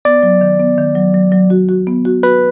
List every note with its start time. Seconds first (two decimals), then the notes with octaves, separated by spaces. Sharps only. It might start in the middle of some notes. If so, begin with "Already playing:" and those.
0.05 B3 D5
0.23 F#3
0.41 D#3
0.60 B3
0.78 D#3
0.95 F#3
1.14 F#3
1.32 F#3
1.50 F#4
1.69 F#4
1.87 B3
2.05 F#4
2.23 F#4 B4